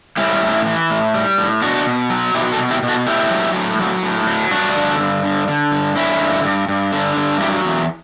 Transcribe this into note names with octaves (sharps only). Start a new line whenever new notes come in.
G3 C#4 E4
A2
E3
A2
G3
A2
B2 D4 F#4
B2
F#3
B2 E4 G4
F#4 A4
B2
E4 G4
B2
F#4 A4
A2 E4 G4
F#3
A2
F#3
A2
F#3
G2 D4 F#4
D3
G2
D3
D3
G2
D3 C#4 E4
G2
G2
G2
D3
G2
F#3 E4 G4
E2